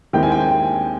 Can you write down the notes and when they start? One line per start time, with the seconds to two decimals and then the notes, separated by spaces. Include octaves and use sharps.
0.13 D#2 D#3 G#3 C4 E4 G5
0.23 G#5
0.32 G5
0.40 G#5